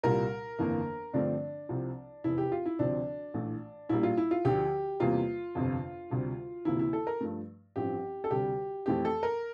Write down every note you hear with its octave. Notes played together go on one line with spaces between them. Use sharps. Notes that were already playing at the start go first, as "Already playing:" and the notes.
C2 A#2 G3 A#4
G1 F2 E3 A#3
G2 D3 F3 A3 C4 D4
C2 C3 F3 C4
F1 E2 C3 E4
G4
F4
E4
D2 C3 F3 C4 D4
A#1 A2 E3 A3
A#1 A2 G3 A#3 E4
F4
E4
F4
D2 D3 F3 G4
E2 C3 G3 A#3 F4
G1 F2 C3
D2 C3 G3
D2 C3 E3 A#3 E4
E4
A4
A#4
G2 F3 A3
A1 G2 F3 C4 G4
A4
D2 C3 G3 G4
F2 E3 A3 C4 G4
A4
A#4